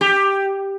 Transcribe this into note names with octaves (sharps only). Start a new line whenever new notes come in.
G4